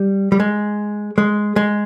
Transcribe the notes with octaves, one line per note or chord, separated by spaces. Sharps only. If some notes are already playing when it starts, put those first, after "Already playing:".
Already playing: G3
G3
G#3
G#3
G#3